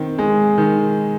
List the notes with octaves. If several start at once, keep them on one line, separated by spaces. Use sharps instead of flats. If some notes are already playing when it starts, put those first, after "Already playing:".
Already playing: D#3 C4
G#3
D#3